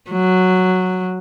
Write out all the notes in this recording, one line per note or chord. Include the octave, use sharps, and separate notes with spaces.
F#3